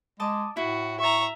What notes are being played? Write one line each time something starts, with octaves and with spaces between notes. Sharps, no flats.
G#3 D#5 A5 D6
A2 E4 F#4
E5 A#5 C#6